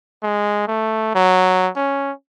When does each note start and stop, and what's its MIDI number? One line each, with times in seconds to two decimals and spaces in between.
0.23 0.67 56
0.68 1.11 57
1.15 1.69 54
1.76 2.12 61